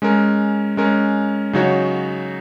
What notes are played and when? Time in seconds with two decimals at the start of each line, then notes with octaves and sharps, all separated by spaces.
0.02 G#3 C#4 A#4
0.77 G#3 C#4 A#4
1.53 C#3 F#3 D#4 F#4 C#5